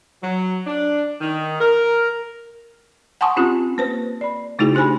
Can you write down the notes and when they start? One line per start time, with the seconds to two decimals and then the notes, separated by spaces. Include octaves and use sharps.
0.23 F#3
0.67 D4
1.20 D#3
1.60 A#4
3.21 F#5 G#5 A5 C6 C#6 D#6
3.37 C4 C#4 F4 G4
3.78 A#3 B4 C5
4.21 D5 B5
4.59 C#3 A3 D#4 E4 F#4 G#4
4.75 D4 G4 C5 G#5 B5